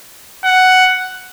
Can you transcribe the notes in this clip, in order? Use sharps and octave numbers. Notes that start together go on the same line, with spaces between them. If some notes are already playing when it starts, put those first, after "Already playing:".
F#5